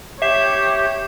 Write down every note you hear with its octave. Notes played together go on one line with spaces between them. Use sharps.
G4 C#5 E5 C7 E7